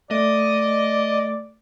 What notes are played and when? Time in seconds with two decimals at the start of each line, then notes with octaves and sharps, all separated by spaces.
0.11 A3 D5 D#5